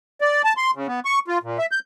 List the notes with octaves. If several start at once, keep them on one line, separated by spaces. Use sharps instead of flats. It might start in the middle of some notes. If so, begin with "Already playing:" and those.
D5
A5
C6
C#3
B3
C#6
F4
A#2
E5
G6